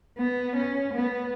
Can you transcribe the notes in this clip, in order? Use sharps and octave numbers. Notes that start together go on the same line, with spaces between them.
B3
C#4
B3